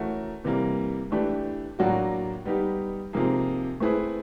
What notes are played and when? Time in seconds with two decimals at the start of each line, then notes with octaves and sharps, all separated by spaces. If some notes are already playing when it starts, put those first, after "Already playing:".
Already playing: E3 A3 C#4 F#4 A#4
0.44 C3 E3 G3 A#3
1.11 E3 A3 D4 G4 B4
1.79 A2 F#3 A#3 D4 F#4
2.45 G3 B3 D#4 G4
3.13 C3 F3 A#3 D#4 G#4
3.80 A3 C4 E4 G#4 B4